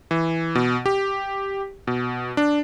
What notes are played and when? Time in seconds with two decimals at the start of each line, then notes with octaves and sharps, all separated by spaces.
0.11 E3
0.55 B2
0.86 G4
1.87 B2
2.37 D4